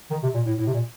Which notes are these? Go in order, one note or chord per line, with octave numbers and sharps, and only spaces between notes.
D#3
C3
A#2
A2
A2
C3
A#2